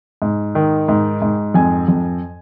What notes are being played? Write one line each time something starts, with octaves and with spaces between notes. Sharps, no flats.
G#2
D#3
G#2
G#2
F2 G#5
F2